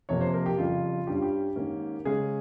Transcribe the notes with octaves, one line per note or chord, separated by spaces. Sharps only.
F2 C3 F3 A#3 C#5
C5
A#4
G4
F2 C#3 G3 F4
G2 G3 C#4 G4
F4
G4
G#2 D#3 A#3 C#4
C#3 G#3 C#4 G#4